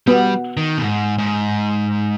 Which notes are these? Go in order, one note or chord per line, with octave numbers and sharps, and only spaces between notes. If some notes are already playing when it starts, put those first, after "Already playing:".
G3 B3
D#3
B2
G#2
G#2